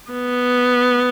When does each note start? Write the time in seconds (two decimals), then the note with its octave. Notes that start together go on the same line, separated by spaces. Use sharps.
0.11 B3